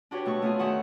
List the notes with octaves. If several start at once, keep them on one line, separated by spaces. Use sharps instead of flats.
D4 F#4 G4 B4 C#5
B2 A3 F#4 C#6
A3 B3 C#4 F4 F#4 G#4
D2 D#3 E5 F#5 C#6